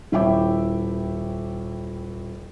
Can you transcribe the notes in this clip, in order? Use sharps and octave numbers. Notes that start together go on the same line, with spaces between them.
D#1 E4 C#5 E5 G5 D6